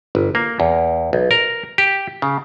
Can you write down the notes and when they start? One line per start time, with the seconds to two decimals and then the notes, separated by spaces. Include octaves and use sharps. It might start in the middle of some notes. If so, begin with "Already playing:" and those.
0.15 G1
0.35 A#3
0.60 E2
1.13 B1
1.31 A#4
1.78 G4
2.22 C#3